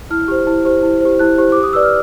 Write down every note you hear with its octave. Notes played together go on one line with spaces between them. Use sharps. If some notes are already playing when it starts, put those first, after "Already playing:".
E4 F6
G4 C5
E4
G4 C5
E4
G4 C5
E4 F#6
G4 C5
G4 D6
D#6
B4 D5 E6
F6